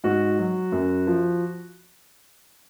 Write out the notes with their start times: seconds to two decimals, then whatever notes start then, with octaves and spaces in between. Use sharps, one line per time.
0.04 G#2 F#4
0.39 F#3
0.72 F#2
1.07 F3